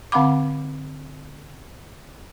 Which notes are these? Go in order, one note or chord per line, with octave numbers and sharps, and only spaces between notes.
D3 C4 F5 F#5 B5 D6